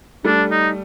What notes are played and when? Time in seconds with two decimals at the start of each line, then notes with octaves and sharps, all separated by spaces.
0.24 G3 A3 D4
0.51 D#4